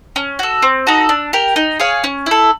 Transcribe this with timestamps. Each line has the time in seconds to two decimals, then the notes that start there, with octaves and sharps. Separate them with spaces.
0.16 C#4
0.39 F#4 A4
0.63 C4
0.87 D#4 F#4 A4
1.09 D4
1.33 G4 A#4
1.56 D#4
1.80 G#4 C#5 F5
2.04 C#4
2.26 E4 A4